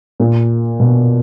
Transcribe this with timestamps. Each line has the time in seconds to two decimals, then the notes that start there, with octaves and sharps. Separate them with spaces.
0.20 A#2
0.80 B2